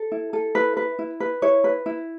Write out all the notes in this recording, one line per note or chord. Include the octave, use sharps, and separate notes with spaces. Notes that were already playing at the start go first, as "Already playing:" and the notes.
Already playing: A4
E4
A4
E4 B4
B4
E4
B4
E4 C#5
B4
E4